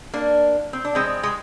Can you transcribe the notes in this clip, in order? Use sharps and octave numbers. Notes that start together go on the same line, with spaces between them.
A#3 D4
C4
D4
G#3 C4
G#3